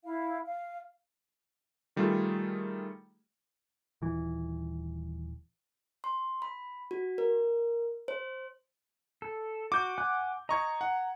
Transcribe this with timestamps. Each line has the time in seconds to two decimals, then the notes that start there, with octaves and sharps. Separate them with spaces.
0.04 E4 F5
0.46 F5
1.96 D#3 G3 A3 F4 G#4
4.02 D#1 E3
6.04 C6
6.42 B5
6.91 F#4
7.18 A#4
8.08 C5
9.22 A4
9.72 F#4 D6 G6
9.98 F#5 G#5 F#6
10.49 D#5 A#5 C#6 G#6
10.81 F#5